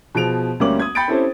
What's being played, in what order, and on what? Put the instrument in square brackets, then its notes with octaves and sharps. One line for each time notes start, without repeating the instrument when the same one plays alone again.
[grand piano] B2 F3 G#4 D7 F7
D2 G3 A#3 C#4 D6 F#7
D#6 G#6
G5 B5 G6 A6 C#7 D7
C4 C#4 E4 G4 A4 C5